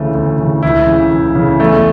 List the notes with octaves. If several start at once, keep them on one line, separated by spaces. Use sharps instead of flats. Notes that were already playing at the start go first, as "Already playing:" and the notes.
Already playing: D2 C#3 E3 A3
D2
C#3 E3
C#2 E4
C#3 E3
C#2
C#3 E3
E2 A3